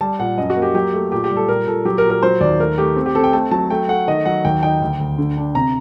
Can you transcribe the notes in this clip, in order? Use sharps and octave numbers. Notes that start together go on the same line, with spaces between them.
G3 A5
A#2 F#5
F#2 D#5
F#4
A#3
G4
F#3 G4
A3
A#2 G4
G4
G3
A4
A#2 A#4
A#2 A4
F#3 G4
A#4
A#2
A#4
F#3 C5
D#2 D5
A3 A#4
A3 G4
C4
G4
C4 A4
G5
A3 A5
F#3 A5
A3 G5
A3 F#5
D#3 D#5
F#3 F#5
D#2 G5
D#4 G5
D2
D2
D3
D4
C3 A#5